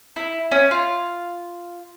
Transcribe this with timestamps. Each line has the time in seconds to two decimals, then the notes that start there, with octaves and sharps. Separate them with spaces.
0.16 E4
0.51 C#4
0.71 F4